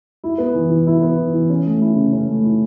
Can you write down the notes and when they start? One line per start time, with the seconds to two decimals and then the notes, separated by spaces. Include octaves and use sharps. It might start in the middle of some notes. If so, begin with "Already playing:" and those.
0.24 E4
0.38 B3
0.54 E3
0.70 E3
0.87 E4
1.02 B3
1.17 E3
1.34 E3
1.50 C#4
1.66 A3
1.81 E4
1.96 C#3
2.13 C#4
2.27 A3
2.44 E4